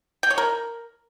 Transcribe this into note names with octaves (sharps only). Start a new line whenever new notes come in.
G5
C#5
A#4